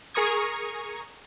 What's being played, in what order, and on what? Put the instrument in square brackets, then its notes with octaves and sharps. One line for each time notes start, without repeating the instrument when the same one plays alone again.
[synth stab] G#4 A#4 A#5 C#6 D#6 G#6